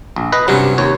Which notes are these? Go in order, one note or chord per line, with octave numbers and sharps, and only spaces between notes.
A#1
B4 D#5
G2 C3 F#3 C#4
D#2 C#5